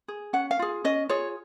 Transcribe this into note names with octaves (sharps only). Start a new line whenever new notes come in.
G#4
C#4 F#5
F5
F4 G#4
C#4 D#5
F4 G#4 C#5